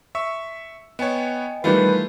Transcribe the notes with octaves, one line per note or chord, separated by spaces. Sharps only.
E5 C#6 E6
B3 C#5 D#5 G5 G#5
D#3 E3 G3 A3 F4 B4 G6 C7